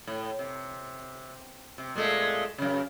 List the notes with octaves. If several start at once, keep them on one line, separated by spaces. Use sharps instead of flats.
A2
C3
C3
A#2 G#3 A3
F#2 C#3